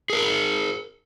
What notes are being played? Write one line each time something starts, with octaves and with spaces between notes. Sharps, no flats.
G#4 A#4